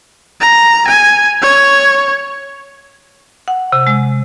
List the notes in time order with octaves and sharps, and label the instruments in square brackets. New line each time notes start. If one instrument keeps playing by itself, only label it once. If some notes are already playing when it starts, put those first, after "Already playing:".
[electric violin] A#5
G#5
C#5
[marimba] F#5
C3
G#3